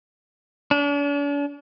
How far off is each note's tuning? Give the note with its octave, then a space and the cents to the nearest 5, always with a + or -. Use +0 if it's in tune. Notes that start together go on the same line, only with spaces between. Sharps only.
D4 -45